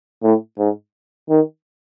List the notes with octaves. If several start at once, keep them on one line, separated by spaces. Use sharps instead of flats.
A2
G#2
D#3